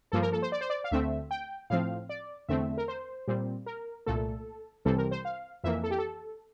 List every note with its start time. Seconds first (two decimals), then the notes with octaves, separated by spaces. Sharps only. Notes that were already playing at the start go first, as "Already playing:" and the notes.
0.12 G2 F3 A#3 A4
0.22 A#4
0.33 A4
0.42 C5
0.52 D5
0.61 C5
0.70 D5
0.84 F5
0.91 D2 D3 A3 C4 E5
1.31 G5
1.70 A2 F3 C4 F5
2.09 D5
2.48 E2 D3 A3 C4 E5
2.78 A#4
2.88 C5
3.28 A#2 G3 C4
3.66 A#4
4.06 C2 A#2 A3 A4
4.85 C2 C3 E3 G3 C4 A4
4.98 A#4
5.11 C5
5.25 F5
5.64 F2 E3 A#3 E5
5.83 A4
5.91 G4
5.98 A4